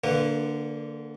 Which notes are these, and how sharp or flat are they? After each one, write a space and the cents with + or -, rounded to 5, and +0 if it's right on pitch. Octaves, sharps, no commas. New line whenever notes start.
D3 +0 A#3 -25 B4 +0